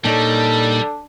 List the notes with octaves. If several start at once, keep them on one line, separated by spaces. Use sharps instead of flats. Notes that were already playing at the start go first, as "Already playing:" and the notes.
A#2 G3 D4 D#4 A4 C#5